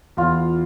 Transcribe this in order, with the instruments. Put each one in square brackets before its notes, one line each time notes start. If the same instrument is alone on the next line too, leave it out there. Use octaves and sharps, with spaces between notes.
[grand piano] E2 [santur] F4